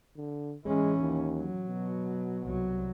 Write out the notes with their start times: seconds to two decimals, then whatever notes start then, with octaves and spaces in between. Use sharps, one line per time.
0.17 D3
0.66 E3 G#3 C#4
1.00 D#2
1.37 F#3
1.69 B2
2.45 C2 F#3